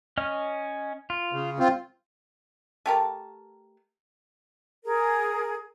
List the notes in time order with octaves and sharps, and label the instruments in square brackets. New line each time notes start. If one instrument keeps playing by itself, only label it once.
[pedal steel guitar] C#4 D#5 F6
F4
[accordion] C#3
C4 F4
[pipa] A3 G4 A#4 A5
[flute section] G#4 A#4